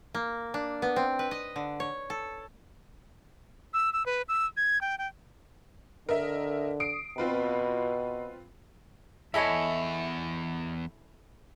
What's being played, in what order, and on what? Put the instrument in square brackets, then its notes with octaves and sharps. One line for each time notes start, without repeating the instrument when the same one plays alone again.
[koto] A#3
D4
B3
C4
B4
D#5
D3
C#5
A4
[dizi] E6
E6
B4
E6
G#6
G5
G5
[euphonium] D3 [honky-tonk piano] A#4 D#5 E5
[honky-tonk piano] D#6 C7 D7
[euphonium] B2 [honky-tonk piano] C4 F4 B4
[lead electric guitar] E2 [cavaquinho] E4 A4 G#5 [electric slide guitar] C#5 D#5 E5